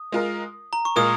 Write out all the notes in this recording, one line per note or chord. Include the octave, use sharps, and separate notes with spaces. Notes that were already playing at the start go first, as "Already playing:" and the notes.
Already playing: D#6
G#3 F4 A#4
A#5
C#6
A#2 G#3 F4 A#4 D#6